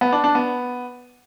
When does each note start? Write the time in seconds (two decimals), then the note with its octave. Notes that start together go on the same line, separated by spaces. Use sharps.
0.01 B3
0.12 D4
0.24 D4
0.35 B3